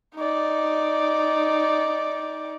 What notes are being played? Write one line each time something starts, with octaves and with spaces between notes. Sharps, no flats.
D#4 D5